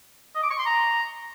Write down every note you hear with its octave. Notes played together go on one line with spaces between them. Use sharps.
D#5
D6
C#6
C6
A#5